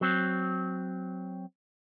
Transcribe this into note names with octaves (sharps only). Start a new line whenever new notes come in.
F#3 C4